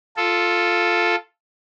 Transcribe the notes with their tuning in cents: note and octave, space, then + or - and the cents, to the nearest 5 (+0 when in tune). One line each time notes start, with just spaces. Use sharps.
F4 +0 A4 +0